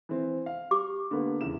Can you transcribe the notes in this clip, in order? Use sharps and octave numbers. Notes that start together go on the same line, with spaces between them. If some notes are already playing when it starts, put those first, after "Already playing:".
E3 C4
F5
G4 D6
D3 A#3 B3
E2 C#3 E7